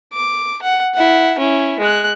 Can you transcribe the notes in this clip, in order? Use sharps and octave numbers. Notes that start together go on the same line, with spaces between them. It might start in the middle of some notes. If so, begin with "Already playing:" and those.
D6
F#5
E4 F#5
C#4 E4
G#3 F#6